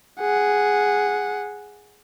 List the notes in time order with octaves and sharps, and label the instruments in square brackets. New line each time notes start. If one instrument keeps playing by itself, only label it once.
[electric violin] G#4 F#5